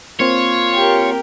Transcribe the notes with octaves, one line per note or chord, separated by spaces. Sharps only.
A#3 C4 F4 C#5
G4 A#4